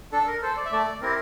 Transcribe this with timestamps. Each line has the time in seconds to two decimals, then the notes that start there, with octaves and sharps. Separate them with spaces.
0.12 D4 A4
0.27 A#4
0.42 A4 C5
0.57 D5
0.65 E5
0.72 A3 D5
1.02 C4 E4 G4 A#4